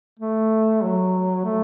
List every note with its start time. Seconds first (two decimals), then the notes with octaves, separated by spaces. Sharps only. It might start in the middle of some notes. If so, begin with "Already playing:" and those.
0.19 A3
0.83 F#3
1.45 A3